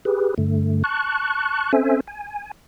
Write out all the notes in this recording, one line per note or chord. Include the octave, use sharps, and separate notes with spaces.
G4 G#4 B4
G2 D3 A3
A5 C#6 F#6
C4 C#4 A4 C5 E5 G#5
G#5